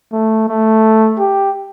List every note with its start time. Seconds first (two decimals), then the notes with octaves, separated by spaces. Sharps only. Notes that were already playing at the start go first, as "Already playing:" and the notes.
0.12 A3
0.49 A3
1.19 G4